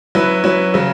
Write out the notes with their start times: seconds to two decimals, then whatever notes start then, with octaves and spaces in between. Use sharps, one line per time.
0.15 F#3 C#4 E4 B4
0.44 F#3 C#4 E4 B4
0.74 C#3 F#3